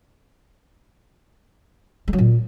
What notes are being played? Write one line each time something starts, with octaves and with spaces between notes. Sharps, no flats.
G#3
F#3
A#2